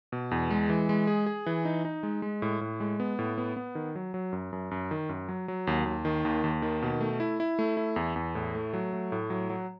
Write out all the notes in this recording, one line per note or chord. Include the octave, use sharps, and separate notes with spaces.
B2
E2
G#3
E3
G#3
G#4
G#4
E3
D#4
D#4
G#3
G#3
A2
A2
G#3
B3
A2
B3
B3
D#3
F#3
F#3
F#2
F#2
F#2
D#3
F#2
F#3
F#3
D#2
D#2
D#3
D#2
D#2
D#3
B2
A3
E4
E4
A3
E4
E2
E2
A2
A3
F#3
A3
A2
F#3
F#3